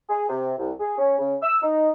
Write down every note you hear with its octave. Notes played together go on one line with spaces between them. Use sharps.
G#4
C3
C2
G#4
C#4
C#3
E6
D#4